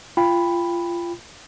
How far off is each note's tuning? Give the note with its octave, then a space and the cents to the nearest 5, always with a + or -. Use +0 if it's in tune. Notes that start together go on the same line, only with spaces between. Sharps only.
F4 -20 G5 +20 B5 +0